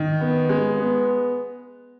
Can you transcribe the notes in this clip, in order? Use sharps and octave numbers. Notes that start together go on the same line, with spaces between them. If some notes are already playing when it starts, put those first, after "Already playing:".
Already playing: D#3
B3
G#3
B3